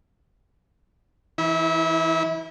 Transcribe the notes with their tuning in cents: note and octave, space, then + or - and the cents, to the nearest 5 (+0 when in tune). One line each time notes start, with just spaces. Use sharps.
E3 +0 E4 -35